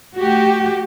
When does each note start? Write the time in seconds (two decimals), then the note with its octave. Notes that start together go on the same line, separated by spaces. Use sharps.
0.17 A3 F#4 G4